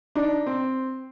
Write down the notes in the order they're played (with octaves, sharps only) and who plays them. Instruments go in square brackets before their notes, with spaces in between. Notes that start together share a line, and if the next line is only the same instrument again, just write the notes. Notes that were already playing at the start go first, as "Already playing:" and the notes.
[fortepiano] D4 D#4
C4